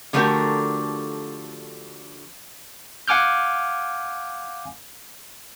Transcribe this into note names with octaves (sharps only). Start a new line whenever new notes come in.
D3 F3 A3 F#4 G4 A#4
F5 F#5 G#5 D6 F6 G6